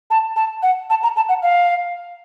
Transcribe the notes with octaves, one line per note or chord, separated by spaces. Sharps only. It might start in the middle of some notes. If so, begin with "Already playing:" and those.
A5
A5
F#5
A5
A#5
A5
F#5
F5